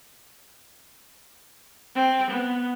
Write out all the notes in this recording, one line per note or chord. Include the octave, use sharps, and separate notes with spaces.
C4
B3